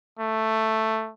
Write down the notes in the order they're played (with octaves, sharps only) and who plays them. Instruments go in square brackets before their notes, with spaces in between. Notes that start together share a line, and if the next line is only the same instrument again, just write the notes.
[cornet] A3